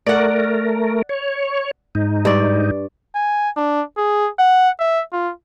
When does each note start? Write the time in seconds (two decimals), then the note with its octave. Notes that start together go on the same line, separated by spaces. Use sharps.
0.07 A3 A#4 D5 F#5
1.09 C#5
1.95 G#2 D#4
2.25 G2 D5
3.15 G#5
3.56 D4
3.97 G#4
4.39 F#5
4.80 E5
5.12 F4